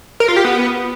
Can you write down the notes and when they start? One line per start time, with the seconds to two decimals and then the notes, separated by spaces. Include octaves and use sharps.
0.20 A#4
0.28 F4
0.36 G4
0.44 B3